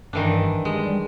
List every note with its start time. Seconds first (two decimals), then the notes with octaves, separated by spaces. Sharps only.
0.13 G2 D#3 E3 D4
0.65 G3 G#3